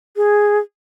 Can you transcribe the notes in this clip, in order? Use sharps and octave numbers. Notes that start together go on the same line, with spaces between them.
G#4